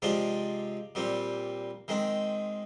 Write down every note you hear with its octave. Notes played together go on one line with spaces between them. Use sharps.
C3 F3 G#3 C4 D5
A#2 G3 C4
D#3 G#3 C4